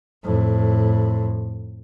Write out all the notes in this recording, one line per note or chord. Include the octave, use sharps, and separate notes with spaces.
F2 A2